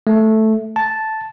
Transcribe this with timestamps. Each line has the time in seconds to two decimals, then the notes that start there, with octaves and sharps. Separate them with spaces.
0.07 A3
0.76 A5